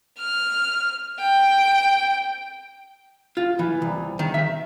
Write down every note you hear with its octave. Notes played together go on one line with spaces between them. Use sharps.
F6
G5
F4
E3
C2
D#3
E5